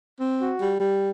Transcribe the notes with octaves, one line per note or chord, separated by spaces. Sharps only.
C4
F#4
G3
G3